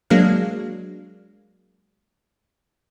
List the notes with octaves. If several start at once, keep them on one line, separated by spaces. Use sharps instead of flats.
F#3 G#3 A#3 D4 F5